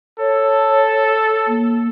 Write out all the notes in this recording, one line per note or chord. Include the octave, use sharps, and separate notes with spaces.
A4 C#5
A#3